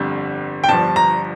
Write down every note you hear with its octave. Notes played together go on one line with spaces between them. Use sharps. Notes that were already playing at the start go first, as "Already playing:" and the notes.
Already playing: G1 F2 D3 G3
G5
G1 G2 F3 A5
A#5